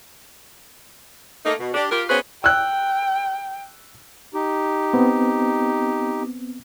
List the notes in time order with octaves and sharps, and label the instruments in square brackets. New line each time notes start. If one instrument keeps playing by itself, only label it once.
[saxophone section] A3 A#3 D#4
B2
D4 G4
F4 G4 A#4
B3 C#4 F#4 G#4 B4 C5
[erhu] G5 [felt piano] E6 F#6
[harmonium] D#4 G4
[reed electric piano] B3 C4